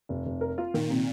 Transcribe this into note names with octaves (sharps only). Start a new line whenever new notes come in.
F1
F1
A#4
F4
A#2 D#3
C3